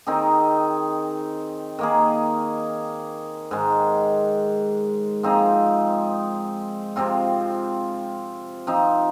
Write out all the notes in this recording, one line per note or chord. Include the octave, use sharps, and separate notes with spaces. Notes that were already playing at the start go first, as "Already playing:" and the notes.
D#3 C4 D#4 G#4
D#3 A#3 G#4
G#2 D#3 G#3
F3 C4 D#4 G#4
C3 F3 C4 F4
F3 C4 D#4